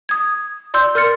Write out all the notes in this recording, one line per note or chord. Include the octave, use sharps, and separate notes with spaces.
D#6 G#6
D5 C6 E6 G6
A#4 C6 F6 A6 C#7